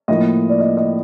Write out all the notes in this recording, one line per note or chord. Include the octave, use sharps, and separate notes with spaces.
A2 F3 A#3 D#5
D5
D#5
D#5